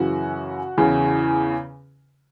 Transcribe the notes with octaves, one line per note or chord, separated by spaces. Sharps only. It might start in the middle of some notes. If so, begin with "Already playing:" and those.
Already playing: F#2 C#3 E3 F#4
E2 C#3 E3